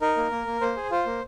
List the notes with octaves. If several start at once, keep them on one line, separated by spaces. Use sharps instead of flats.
D#4 A#4
A#3
A#3
A#3
A#3 C5
G#4
F4 C5
A#3